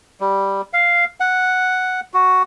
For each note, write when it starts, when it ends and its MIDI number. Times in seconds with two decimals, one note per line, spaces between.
0.20 0.62 55
0.73 1.05 77
1.20 2.00 78
2.14 2.42 66